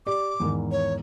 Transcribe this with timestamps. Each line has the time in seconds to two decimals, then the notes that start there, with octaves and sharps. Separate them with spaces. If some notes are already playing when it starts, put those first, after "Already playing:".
0.07 G4 D5 D6
0.40 E2 G#2 D#3
0.72 C#5